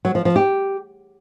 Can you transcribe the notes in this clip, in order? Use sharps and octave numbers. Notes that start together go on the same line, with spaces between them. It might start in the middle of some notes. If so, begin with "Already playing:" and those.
F#3
F3
F3
G4